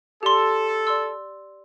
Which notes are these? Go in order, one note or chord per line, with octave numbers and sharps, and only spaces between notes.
G4 A4 D5 C6
D5 C6 E6